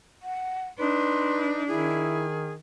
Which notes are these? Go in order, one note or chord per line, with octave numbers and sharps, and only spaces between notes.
F#5
D4 D#4 B4 C6
D#3 E4 G#4